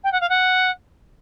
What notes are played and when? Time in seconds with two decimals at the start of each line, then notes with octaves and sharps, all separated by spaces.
0.04 G5
0.12 F#5
0.21 F5
0.29 F#5